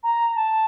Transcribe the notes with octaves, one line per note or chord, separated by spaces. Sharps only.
A#5
A5